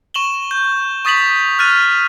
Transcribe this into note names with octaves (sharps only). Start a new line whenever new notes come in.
C#6 E7 F#7 G7
G6
C#6 D#6 A6 B6 F7 F#7
F6 F#6 A6 D#7 F7